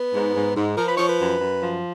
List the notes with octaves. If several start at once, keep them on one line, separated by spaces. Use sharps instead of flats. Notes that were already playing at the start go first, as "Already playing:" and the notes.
Already playing: B3
G#2
G#2
G#2
F3 A#4
B4
F3 C#5
B4
F#2
F#2
F3